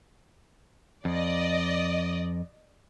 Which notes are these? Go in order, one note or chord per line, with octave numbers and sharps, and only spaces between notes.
F2 D5 D#5